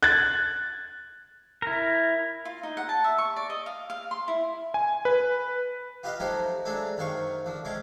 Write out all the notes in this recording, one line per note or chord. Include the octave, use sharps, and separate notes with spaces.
F#6 G#6 A6
E4 A#4
F4
D#4
F#5
A5
E5
C#6
D5
D#5
F5
F5
C6
E4
G#5
B4
F4 G4 B4 D#5 F5
F3 F#3 A3 D#4 G4 C5
F#3 G#3 A3 D4 A4
F#2 C3 D#3 C5 F5 C#6
D3 F3
C3 G#3 C#4 D6